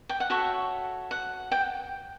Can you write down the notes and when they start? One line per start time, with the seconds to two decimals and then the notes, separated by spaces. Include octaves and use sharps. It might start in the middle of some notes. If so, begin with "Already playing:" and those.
0.09 G5
0.20 F#5
0.30 F#4 A4 C#5 E5
1.11 F#5
1.52 G5